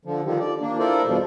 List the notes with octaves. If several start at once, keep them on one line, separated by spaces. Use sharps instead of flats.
D3 F3
D3 D#3 F3 G3
D5
A#3 D4
E4 F4 A4 A#4 C5 D5
E2 G2 B2 F3